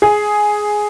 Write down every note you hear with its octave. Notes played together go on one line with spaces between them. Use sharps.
G#4